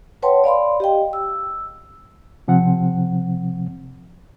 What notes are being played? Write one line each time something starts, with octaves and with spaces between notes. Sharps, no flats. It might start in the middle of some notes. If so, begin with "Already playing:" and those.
B4 C#5 F#5 G5 A5 C6
D5 F5 B5 C6
G4 D#5 G5
E6
C3 F3 C4 F#5